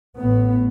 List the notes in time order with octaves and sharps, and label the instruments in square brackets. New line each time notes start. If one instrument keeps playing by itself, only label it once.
[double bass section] A1 A2 B3